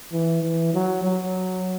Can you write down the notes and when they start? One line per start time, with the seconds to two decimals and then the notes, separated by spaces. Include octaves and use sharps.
0.12 E3
0.42 E3
0.74 F#3
1.04 F#3